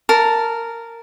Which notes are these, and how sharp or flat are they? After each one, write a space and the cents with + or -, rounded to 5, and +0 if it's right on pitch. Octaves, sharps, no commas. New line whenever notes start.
A#4 -10 A5 +0